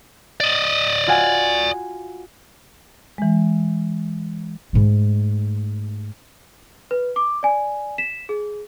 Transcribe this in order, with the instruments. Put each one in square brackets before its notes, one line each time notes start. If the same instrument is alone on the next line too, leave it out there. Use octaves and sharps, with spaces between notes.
[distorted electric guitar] D5 D#5
[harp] F4 F#4 G#5
[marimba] E3 G#3
[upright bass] G#2 A3
[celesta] B4
D6
D5 G#5
B6 E7
G#4